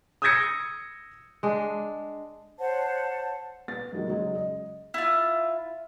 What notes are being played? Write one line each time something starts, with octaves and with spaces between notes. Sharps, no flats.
D#6 E6 G6 G#6 A#6 C#7
G#3 D4
C5 C#5 F#5 A5
B3 A6
F#2 D#3 G#3 A#3 F#4
F#2 C#3 F#3 G#3
D#5
E4 F4